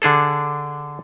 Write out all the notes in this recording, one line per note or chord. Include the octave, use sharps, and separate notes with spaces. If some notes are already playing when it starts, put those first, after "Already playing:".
D3 D4 G#4 A4